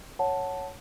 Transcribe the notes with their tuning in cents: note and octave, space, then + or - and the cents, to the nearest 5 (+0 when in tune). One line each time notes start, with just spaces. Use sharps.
C#5 +0 F#5 +0 A5 +0